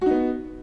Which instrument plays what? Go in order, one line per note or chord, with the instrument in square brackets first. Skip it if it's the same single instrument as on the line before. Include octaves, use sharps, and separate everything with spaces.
[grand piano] F#4
D#4
B3